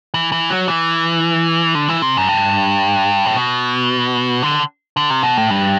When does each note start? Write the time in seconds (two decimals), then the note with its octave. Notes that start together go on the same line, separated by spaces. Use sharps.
0.14 E3
0.32 E3
0.50 F#3
0.68 E3
1.75 D3
1.88 E3
2.02 C3
2.17 F#2
2.28 G2
3.25 A2
3.36 B2
4.42 D3
4.97 D3
5.10 C3
5.23 B2
5.37 A2
5.50 G2